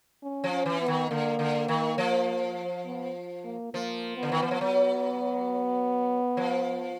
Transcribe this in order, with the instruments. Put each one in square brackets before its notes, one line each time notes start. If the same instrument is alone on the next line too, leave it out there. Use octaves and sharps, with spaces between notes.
[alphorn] C#4
[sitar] F3
[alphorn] C#4
[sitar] E3
[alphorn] B3
[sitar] D#3
[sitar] D3 [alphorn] A#3
[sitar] D3
D#3
F3
[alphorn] B3
A#3
[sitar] F3 [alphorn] A#3
[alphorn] B3
[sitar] D3
D#3
E3
F3
[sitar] F#3 [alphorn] B3
[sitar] F3